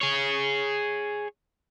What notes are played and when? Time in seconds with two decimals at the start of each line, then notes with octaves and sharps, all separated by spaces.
0.01 G#4 C#5